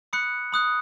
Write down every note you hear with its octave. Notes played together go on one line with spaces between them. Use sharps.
B5 D#6 F#6 C#7
B5 D#6 F#6